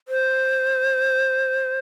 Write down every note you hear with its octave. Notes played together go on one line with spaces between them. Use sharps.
C5